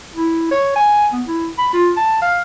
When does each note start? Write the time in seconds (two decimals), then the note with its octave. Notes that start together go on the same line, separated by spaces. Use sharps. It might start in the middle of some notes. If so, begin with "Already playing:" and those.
0.16 E4
0.51 C#5
0.76 G#5
1.13 B3
1.27 E4
1.59 B5
1.74 F4
1.97 A5
2.22 F5